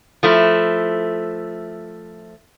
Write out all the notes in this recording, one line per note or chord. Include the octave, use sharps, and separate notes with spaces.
F3 A3 E4